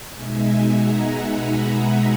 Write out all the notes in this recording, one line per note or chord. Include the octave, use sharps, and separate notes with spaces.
B2 G#3 D#4 E5 G#5
F#5 A#5
G#5 B5
G#5 B5